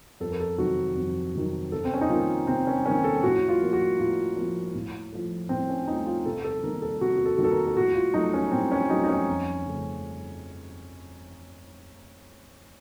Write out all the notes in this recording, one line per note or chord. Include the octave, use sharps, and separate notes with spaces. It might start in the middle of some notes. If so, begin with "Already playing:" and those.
F2 A4
A#4
A4
C3 D#3 F#3 F#4
F2
C3 D#3 F#3
C3 A4
C4
C#4
D#4
D#3 A#3 F4
C3 C4
C#4
D#3 A#3 C#4
A4
A2 F#4
F4
F3 A#3
F#4
A2 F4
F3 A#3
A2
F3 A3
A2 C4
C#4
F3 A3 D#4
F4
C3 A4
A4
D#3 A#3 A#4
A4
C3 F#4
F#4
A4
D#3 A#3 F#4
A4
A#4
A4
A2 F#4
F4
F#3 A3 D#4
C#4
A2 C4
C#4
F#3 A3 D#4
D#4
C#4
F2
C#3 A3